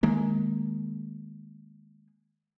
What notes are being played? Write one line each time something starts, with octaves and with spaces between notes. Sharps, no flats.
D#3 G#3 A#3